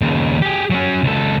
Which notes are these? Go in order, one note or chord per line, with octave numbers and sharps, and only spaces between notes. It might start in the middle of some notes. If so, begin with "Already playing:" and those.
D#2 C#3
G4 G#4
F#3 C#4
C#2 A4